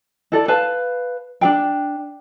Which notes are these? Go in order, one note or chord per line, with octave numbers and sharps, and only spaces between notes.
E4 A4 D5
B4 F5 A5
D4 G#4 G5